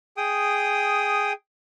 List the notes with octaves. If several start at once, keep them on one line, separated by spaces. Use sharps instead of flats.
G#4 G5 D#6